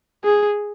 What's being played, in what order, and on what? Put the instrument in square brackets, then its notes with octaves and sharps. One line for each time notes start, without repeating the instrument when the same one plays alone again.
[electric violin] G#4